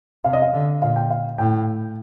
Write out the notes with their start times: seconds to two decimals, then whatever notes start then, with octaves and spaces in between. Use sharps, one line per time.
0.24 C3 F5
0.33 D#5
0.42 F5
0.53 D3
0.82 A#2 F5
0.96 G5
1.10 F5
1.38 A2 G5